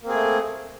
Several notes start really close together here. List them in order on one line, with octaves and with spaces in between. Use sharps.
A#3 C4 G#4 A3